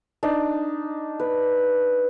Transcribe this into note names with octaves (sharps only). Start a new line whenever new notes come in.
D4 D#4
B4